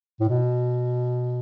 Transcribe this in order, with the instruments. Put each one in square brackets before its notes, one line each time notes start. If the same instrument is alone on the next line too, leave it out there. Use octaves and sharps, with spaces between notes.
[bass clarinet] A2
B2